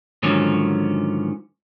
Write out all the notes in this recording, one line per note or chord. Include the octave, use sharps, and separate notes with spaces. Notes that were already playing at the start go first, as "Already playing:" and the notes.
G#2 D3 D#3 F3 F#3 C#4